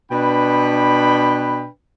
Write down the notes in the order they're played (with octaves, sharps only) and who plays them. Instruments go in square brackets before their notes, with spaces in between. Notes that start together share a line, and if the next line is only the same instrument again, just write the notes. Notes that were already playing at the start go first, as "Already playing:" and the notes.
[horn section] B2 D4 B4 G5 B5